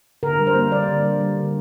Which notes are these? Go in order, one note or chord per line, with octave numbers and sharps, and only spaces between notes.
D3 A#4
G3
C5
A#3
G3 D5
D3
G3
G3
D3